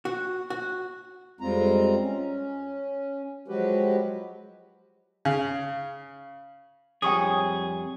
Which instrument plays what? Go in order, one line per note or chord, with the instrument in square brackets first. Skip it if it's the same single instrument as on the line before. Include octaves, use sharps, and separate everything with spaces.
[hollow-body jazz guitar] F#4
F#4
[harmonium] F2 G3 G#3 C4 F4 A#5
C#4
F3 F#3 G#3 F#4 G4 B4
[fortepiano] C#3
[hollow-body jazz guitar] F2 G3 C#5 [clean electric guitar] G#4 [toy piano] G5 C#6 D#6